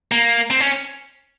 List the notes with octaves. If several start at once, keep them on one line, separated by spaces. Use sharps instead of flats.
A#3
C4
C#4